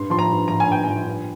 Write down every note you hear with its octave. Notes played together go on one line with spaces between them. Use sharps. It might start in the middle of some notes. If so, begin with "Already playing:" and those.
Already playing: G2 C6
F3 C6
A#5
G2
F3 A#5
G#5
G2 G5
F3 G#5
G2